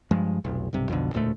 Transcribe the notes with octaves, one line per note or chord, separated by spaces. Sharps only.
G2 F3 G#3
F1 B1
B1 G2 C3
B1 F2 B2 D3
E1 D2 A#2 A3